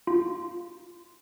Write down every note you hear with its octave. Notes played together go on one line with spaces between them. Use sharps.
F4